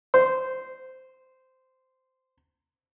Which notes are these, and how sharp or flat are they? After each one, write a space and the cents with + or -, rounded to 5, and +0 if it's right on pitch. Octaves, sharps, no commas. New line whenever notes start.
C5 -10